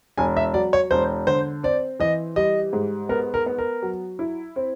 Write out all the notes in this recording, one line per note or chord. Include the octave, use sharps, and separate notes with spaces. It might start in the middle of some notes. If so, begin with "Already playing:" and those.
E1 G#5
E5
F#3 D5
C#5
E1 C5
D3 C5
C4 D5
E3 D#5
G3 D#5
G#2
B3 A#4
A#4
B3
A#4
F#3
E4
C4